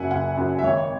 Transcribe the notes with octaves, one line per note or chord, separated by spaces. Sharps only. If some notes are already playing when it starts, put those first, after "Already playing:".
Already playing: F#1 F#2 F#3 E5 F#5 G#5
F#1 F#5
F#2 F#3
E5
G#1 C#5